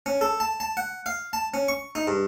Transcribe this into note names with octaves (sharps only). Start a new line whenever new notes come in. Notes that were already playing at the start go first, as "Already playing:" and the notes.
C#4
A4
A5
A5
F#5
F5
A5
C#4
C#6
D#4
G2